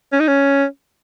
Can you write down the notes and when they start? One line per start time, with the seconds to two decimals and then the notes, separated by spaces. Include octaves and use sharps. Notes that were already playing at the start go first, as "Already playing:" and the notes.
0.13 C#4
0.20 D#4
0.28 C#4